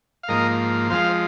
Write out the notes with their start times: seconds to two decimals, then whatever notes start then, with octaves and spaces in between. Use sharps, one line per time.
0.23 F5
0.28 G#2 F3 A#3 A#4 D#5
0.90 F2 F3 G#3 C5 F5